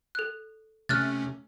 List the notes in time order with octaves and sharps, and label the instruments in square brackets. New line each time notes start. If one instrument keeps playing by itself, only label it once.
[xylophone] A4 F#6
[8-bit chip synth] C3 A3 C#4 [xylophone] F6 F#6 A6